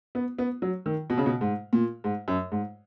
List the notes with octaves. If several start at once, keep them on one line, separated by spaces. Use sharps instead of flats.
B3
B3
F#3
D#3
B2
C#3
B2
G#2
A#2
G#2
F#2
G#2